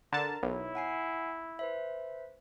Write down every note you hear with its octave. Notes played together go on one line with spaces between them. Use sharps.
D3 A#4 A5 A#5
B1 E4 C#5
F#5 G#5 C7
B4 C5 E5